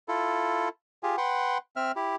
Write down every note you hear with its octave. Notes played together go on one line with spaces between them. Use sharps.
E4 F4 A4
F4 G4 G#4
B4 F#5 G5 C6
C4 E5 F6
E4 G4